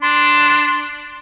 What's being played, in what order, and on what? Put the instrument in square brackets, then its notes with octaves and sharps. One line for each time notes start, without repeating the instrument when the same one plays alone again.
[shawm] D4 [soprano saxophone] C6